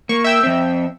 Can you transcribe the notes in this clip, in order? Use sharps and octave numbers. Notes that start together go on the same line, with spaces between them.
A#3 C#6
E5 G5 E6
F2 C4